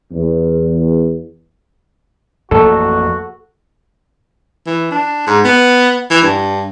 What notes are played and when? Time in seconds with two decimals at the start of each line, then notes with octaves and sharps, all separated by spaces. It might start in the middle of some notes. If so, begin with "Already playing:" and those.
0.12 E2
2.51 A1 F2 A#3 F#4 A4
4.66 E3
4.91 D4
5.27 G#2
5.45 B3
6.10 E3
6.22 G2